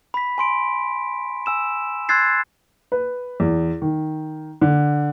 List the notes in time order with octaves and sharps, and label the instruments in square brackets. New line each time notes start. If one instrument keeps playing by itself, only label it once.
[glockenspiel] B5 B6
G#5 C6 D7
G#5 E6 E7
C6 E6 F#6 G#6 A6 C7
[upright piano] B4
E2
D#3
D3